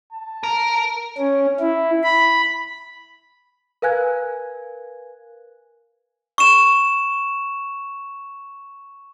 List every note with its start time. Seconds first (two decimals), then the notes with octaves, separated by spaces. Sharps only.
0.13 A5
0.43 A#4
1.18 C#4
1.60 E4
2.03 B5
3.82 A#4 B4 F5 G#5 F#6 G#6
6.38 C#6 E7